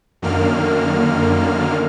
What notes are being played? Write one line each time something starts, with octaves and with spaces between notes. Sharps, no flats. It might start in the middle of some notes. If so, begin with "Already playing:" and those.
F#2 D3 D#3 A#3 F6